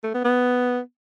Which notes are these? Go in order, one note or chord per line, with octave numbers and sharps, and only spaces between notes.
A3
B3
B3